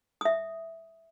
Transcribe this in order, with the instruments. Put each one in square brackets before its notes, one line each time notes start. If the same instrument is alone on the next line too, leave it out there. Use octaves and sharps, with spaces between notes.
[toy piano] E5 D#6